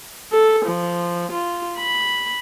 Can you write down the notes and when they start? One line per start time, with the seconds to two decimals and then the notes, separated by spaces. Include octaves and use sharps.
0.32 A4
0.66 F3
1.32 F4
1.78 B5